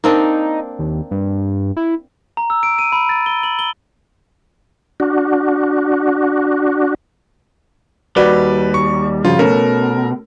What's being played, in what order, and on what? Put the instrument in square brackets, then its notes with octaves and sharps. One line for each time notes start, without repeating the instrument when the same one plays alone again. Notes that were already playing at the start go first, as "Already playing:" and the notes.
[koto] A#3 C4 D4 [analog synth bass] D#4
[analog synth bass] D#2
G2
E4
[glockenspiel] A#5
E6
D7
D#7
B5
A6
G7
F#7
G7
[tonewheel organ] D4 F#4
[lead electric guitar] D#2 G3 [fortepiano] F#4 D5 [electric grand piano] B4
[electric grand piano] C#6
[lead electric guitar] G2 [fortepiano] C#3 F3 F#4 [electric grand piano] F4
[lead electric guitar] B2 [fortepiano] A3 C#4 [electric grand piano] A#4